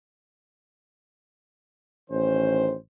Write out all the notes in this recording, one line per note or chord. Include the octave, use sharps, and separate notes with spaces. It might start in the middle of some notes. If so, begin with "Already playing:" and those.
A1 D#3 C#4 C5